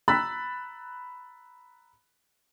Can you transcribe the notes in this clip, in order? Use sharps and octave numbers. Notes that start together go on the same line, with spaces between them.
A#5 B5 E6 F#6 A6 B6